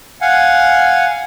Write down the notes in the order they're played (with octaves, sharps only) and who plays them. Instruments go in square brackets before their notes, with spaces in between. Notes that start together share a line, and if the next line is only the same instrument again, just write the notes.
[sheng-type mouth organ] F5 F#5 G#5